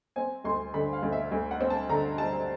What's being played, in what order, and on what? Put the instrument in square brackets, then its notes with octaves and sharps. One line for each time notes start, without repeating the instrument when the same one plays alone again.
[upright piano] C4 G#5
D2 C6
D3 B5
F5
D2
E5
D2
F#5
C4
A5
D3 A#5
G3 A5